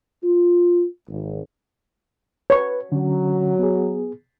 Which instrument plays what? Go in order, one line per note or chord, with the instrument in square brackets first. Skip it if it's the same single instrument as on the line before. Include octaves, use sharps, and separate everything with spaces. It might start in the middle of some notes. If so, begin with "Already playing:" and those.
[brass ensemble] F4
G#1
[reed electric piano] B4 [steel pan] C#5 C#6
[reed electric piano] D3 C#4 [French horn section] F#3
[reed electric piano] B3 G#4